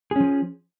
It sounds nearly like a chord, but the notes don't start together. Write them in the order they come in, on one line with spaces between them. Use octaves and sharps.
G#4 C#4 F3